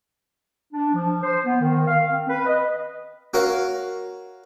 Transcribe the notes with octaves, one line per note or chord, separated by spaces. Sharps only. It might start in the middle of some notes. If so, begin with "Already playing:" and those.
D4
F3
C5
B3
D#3
F5
C4
B4
D#5
F#4 A#4 C#5 F5